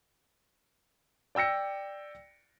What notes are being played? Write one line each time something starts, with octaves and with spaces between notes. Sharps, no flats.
D5 G5 E6 A#6 C#7